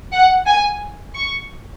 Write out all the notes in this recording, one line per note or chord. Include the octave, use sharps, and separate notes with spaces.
F#5
G#5
C#6